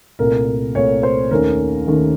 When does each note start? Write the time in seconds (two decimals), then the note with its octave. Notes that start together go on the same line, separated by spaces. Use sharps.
0.19 C2 A#2 A3 A#4
0.75 C2 A#2 A3 C#5
1.03 C5
1.31 D#2 D#3 A3 C#4 A#4
1.87 D#2 D#3 A3 C#4